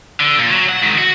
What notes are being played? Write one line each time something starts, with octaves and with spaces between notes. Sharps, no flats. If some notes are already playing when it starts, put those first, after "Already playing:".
D3
A#2
F#3
F#5
G#2 D#3
F#4